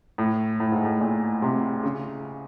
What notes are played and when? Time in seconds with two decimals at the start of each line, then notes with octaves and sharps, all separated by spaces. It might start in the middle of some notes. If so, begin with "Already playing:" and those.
0.18 A2
0.60 A2
0.72 G#2
0.85 A2
1.01 A#2
1.42 C3
1.83 C#3